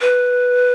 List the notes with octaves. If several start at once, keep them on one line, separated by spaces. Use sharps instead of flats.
B4